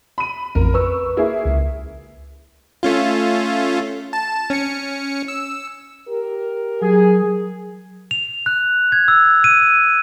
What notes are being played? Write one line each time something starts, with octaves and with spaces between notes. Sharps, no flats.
B5 D#7
A1 F2 A#4
B4 C#6 E6
A#3 E4 G#4
C#2
A3 C#4 F4
A5
C#4 C#7
E6
G4 A#4
F#3 G#4
F7
F#6
G#6
E6
D#7